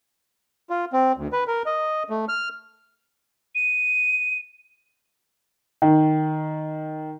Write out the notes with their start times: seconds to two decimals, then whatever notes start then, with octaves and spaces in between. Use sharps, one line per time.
0.70 F4
0.93 C4
1.17 D2
1.33 B4
1.47 A#4
1.66 D#5
2.10 A3
2.29 F6
3.55 D#7
5.82 D#3